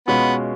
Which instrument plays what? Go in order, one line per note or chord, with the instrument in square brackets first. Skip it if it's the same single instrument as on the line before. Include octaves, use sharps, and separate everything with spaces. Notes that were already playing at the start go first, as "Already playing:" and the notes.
[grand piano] B2 G#3 C#4 F4 [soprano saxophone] B3